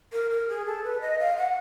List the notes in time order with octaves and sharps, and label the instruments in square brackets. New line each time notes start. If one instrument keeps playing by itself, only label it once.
[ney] A#4
A#4
G#4
A4
B4
D#5
F5
F#5